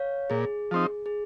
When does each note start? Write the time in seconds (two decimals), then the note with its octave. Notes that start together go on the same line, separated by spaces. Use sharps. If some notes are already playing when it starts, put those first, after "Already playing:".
Already playing: C#5 F5
0.30 A#2 G#4
0.71 F3 C4 D#4
1.06 G#4